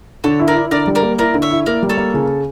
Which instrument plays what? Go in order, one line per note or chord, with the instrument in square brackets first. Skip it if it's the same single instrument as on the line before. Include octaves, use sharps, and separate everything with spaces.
[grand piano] D3 [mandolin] A4 C#5
[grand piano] E4
[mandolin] A#4 D5
[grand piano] E4
[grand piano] D3 [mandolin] A#4 D5
[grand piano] G3
[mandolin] A#4 D5
[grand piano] A#3
[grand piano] E4 [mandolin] A#4 D5
[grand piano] D3
[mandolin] C#5 E5
[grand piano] E4
[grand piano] A#3 [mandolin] A#4 D5
[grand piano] G3
[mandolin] A4 C#5
[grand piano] A#3
C#3